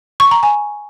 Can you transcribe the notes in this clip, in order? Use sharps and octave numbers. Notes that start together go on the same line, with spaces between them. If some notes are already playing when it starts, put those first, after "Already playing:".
C#6
A#5
G#5